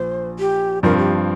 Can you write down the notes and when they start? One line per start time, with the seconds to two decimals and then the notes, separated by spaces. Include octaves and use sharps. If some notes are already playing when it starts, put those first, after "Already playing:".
Already playing: A#1 A#2 C5
0.39 G4
0.83 G2 F3 C4 A#4
0.98 G4